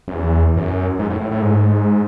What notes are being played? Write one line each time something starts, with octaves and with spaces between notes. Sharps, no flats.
F#2
E2
F#2
G#2
A2
A2
A2
G#2